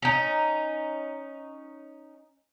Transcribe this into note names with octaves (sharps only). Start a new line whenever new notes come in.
C#4 D#4